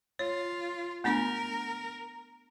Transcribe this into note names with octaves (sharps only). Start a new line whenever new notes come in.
F4 C#5
A3 B3 D4 A#4